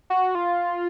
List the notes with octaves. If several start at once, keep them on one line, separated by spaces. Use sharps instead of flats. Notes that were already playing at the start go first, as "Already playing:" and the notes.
F#4
F4